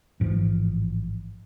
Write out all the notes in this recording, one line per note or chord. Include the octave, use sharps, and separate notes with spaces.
A1 G#2 E3 F3